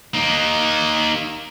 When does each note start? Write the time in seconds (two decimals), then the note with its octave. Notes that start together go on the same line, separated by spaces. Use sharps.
0.14 A#3 D#4